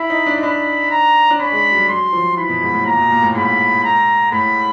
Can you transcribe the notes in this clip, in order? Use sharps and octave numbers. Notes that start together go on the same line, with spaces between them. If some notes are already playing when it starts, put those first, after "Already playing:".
Already playing: E4 B5
D#4
D4
D#4
D4 B5
A#5
D4
C#4 B5
G#3
F#3
G3
F#3 C6
F3
E3 B5
B2
G#2
A2
A#2 A#5
B2
A#2
A2
G#2 B5
A#5
A2 B5